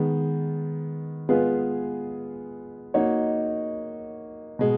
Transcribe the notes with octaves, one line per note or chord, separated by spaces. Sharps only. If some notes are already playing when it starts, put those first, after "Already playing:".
Already playing: D#3 G#3 B3
G#3 B3 F4 G#4 B4
A#3 D#4 F#4 C#5
B2 G#3